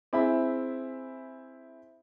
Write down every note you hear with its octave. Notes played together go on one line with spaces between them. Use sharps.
C4 E4 G#4 E5 B5